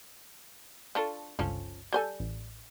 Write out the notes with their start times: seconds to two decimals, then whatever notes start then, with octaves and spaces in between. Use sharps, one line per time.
0.95 D4 F4 A4 A5 C#6
1.39 G1 C#2 F3 C#4 A4
1.93 G3 A4 C5 G#5 G6
2.20 A1